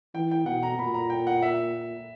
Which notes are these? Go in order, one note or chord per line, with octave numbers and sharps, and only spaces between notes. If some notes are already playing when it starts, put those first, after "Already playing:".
E3 G5
G5
B2 F#5
A#5
A#2 B5
A#5
G5
F#5
E5